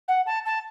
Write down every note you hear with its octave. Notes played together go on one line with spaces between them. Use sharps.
F#5
A5
A5